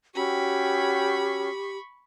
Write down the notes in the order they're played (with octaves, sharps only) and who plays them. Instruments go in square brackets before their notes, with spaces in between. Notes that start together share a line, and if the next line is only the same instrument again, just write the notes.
[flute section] C#4 F#4 E6 [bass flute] G4 [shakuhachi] G5 [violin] B5 C#6